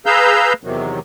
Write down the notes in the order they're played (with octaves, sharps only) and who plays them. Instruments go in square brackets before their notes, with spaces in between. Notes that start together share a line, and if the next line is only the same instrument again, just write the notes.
[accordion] G#4 B4 F5 A#5 E6 G6
E2 C3 D#3 F#3